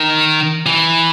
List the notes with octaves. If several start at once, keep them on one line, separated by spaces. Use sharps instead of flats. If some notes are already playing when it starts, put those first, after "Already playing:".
Already playing: D#3
E3